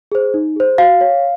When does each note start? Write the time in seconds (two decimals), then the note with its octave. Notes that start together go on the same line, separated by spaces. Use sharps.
0.12 G#4 C5
0.34 D#4
0.56 G#4 C5
0.78 F#4 F5
1.01 C#5